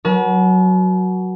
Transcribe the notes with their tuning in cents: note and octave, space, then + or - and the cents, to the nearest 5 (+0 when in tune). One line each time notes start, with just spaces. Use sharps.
F#3 +0 B4 -45 A5 -45